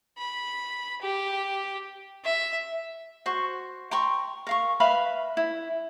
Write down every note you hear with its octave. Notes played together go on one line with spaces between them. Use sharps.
B5
G4
E5
F#4 C5 C#6
G5 A#5 C6 C#6
A#4 F5 C#6
B4 E5 F5 B5
E4